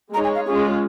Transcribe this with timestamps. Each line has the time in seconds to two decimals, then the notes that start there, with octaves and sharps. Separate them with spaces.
0.14 G#3 D#4 G#4 C#5 A#5
0.24 G#5
0.35 F5
0.46 G#3 C#4 F4 G#4